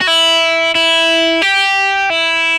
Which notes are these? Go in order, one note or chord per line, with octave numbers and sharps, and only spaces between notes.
F#4
E4
E4
G4
E4